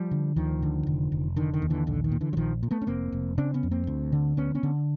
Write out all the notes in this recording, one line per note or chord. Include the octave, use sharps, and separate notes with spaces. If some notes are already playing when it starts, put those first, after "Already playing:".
Already playing: F3 G3
D3
D2 D#3 F3
D3
F1
F1
D3 D#3
D#3
D#2
D3 E3
A#1 D3
D#3
A#2
D3 E3
F#3
A#1 D#3 F3
A#2
A3 B3
C#4
F1 A#3 C4
F1
C#3 C4 D4
B3 C#4
F2
A#3 C4
D2
D3
D2 B3 C#4
B3 C#4
D3